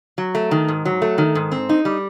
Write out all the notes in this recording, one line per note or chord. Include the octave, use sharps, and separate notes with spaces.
F#3
A3
D#3
G#2
F#3
A3
D#3
G#2
C4
D#4
G3